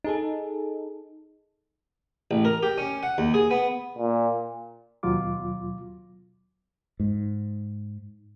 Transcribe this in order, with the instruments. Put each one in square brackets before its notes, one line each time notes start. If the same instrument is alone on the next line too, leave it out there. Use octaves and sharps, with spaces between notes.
[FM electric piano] D#4 G#4 A4
[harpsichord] A1
A#4
G4
C#4
F#5
D#2
G#4
B3
[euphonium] A#2
[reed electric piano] D#2 B2 F#3 F4 D6
[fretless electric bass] G#2